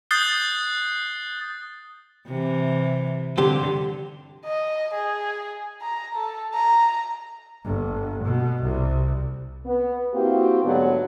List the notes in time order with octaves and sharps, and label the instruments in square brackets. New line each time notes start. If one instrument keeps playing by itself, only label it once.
[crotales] D#6 F#6 G6 A6 C7 G7
[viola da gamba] C3 E3
[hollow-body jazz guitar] G2 C4 G4 [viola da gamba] D3
[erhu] D#5
G#4
A#5
A4
A#5
[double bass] G1
B2
C2
[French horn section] B3
A#3 C4 E4 F#4 G4
G#2 D3 F#3 A3 B3